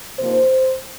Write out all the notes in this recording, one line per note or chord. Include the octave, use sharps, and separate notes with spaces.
C3 F3 A#3 D#4 C5